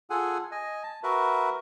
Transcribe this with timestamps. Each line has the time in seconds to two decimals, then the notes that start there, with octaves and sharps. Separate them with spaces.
0.10 F4 G#4 A4 F#5 G#5
0.52 D#5 G#5
0.83 A5
1.03 F#4 A#4 B4 E5